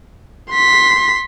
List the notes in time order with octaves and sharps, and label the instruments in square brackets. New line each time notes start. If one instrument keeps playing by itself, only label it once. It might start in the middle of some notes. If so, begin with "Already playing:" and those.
[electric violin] C6 B6